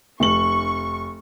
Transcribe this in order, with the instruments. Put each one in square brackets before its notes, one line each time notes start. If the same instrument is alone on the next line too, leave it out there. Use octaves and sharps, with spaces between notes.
[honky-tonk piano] F1 F#7 [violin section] C#6